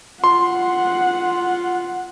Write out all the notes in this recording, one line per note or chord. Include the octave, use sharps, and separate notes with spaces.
F4 F#5 C6